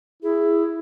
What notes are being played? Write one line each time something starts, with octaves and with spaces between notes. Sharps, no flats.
E4 G#4